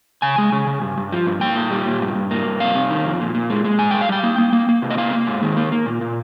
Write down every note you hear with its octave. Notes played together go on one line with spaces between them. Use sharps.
C#3 G#5
G#3
C#3
C#3
G2
G2
F3
G2
A#3 G5
A#2
G3
A#2
G2
G2
A#3
G2
C3 F5
C3
D#3
F2
A#2
A#2
G#3
G#3
G#2 G#5
G#2 G5
F5
G3 G5
A#3
A#3
A#3
A#3
C3
D#5
A#3 F5
A#3
G#2
D#3
A#3
A#3
A#2
A#2